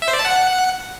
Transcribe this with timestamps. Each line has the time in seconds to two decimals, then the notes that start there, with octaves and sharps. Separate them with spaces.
0.02 E5
0.08 C5
0.13 D5
0.19 A5
0.25 F#5